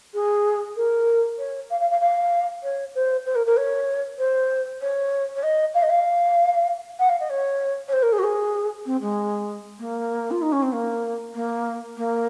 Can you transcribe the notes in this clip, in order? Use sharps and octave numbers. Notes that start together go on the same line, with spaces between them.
G#4
A#4
C#5
F5
F5
F5
F5
C#5
C5
C5
A#4
A#4
C#5
C5
C#5
C#5
D#5
F5
D#5
F5
F#5
F5
D#5
C#5
C#5
C5
A#4
G#4
F#4
G#4
C4
G#3
A#3
F4
D#4
C#4
C4
A#3
A#3
A#3